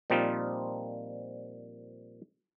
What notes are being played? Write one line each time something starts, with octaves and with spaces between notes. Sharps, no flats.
A#2 F3 G3 C4 D#4 F4